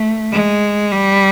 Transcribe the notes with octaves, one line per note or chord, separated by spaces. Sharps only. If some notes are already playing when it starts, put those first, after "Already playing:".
Already playing: A3
G#3
G3